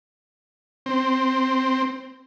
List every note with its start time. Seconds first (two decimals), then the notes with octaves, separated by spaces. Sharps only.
0.86 C4